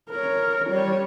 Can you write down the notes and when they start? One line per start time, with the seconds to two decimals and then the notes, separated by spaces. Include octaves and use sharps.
0.10 A#4 C#5
0.70 G3 C#5